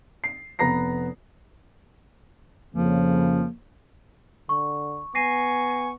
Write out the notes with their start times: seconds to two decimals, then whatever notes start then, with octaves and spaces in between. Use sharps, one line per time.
0.24 C7
0.59 F1 B3 B4 A#5 A#6 C7
2.75 F2 C#3 F3 A#3
4.49 D3 C#6
5.15 B3 G#5 C#6 A#6 C7 D#7